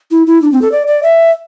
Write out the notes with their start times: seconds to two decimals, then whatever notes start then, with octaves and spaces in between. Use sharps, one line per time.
0.11 E4
0.27 E4
0.42 D4
0.52 C4
0.62 A4
0.72 D5
0.87 D5
1.03 E5